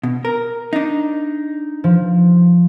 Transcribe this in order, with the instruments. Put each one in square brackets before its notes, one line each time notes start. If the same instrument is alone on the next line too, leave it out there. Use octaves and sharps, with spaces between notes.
[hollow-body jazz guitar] B2
A#4
D4 D#4
[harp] F3